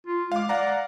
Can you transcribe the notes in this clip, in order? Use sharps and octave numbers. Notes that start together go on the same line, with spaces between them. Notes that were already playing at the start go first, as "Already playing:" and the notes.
F4
G#3 F5 D6
D5 F5 F#5 A#5